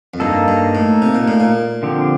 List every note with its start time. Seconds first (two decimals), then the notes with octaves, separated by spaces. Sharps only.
0.14 F2
0.20 G2 A#3 D#4 A4
0.48 G2
0.75 A2
1.02 C3
1.15 A#2
1.28 A2
1.40 A#2
1.83 D3 F3 C4 G4